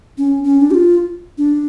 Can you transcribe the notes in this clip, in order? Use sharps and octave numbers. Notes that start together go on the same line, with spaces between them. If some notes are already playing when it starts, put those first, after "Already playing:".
C#4
C#4
D4
G4
F4
D4